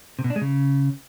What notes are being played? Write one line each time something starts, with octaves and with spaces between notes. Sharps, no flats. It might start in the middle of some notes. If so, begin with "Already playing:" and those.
C3
B2
D4
G#3
C#3